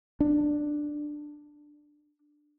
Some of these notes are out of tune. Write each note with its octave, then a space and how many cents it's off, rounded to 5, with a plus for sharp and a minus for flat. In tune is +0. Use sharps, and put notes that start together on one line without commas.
D4 +10